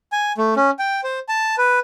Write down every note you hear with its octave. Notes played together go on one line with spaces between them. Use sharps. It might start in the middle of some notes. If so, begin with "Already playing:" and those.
G#5
A3
C#4
G5
C5
A5
B4